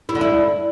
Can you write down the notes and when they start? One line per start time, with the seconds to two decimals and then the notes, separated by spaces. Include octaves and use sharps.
0.09 E4
0.15 D3
0.21 E4